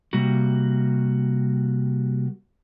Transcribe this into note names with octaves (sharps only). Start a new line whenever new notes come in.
C3 G3 A#3 F#4